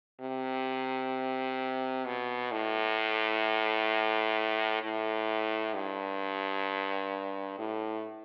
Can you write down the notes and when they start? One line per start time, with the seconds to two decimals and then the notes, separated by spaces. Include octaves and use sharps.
0.21 C3
2.06 B2
2.52 A2
4.83 A2
5.74 G2
7.59 A2